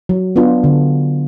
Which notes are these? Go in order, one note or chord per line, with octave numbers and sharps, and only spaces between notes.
F#3
B3 D4 F4
D3